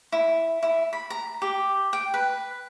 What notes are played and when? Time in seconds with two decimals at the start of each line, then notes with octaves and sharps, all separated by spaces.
0.12 E4
0.63 E4
0.93 B5
1.10 A#5
1.42 G4
1.93 G5
2.14 B4